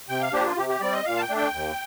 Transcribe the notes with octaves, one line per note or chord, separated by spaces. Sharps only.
C3 G5
F5
F3 A#3 D4 G4
F4
C3 G4
G4
G3 C4 D5
D#5
A#2 F5
A5
G5
A3 D4
G5
D#2